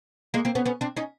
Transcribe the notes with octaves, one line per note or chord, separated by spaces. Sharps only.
G#3 A#3
A#3 C4
B3 C#4
B3 C#4
C4 D4
C#4 D#4